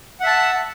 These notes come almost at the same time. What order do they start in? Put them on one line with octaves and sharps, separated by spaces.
F#5 E5 A5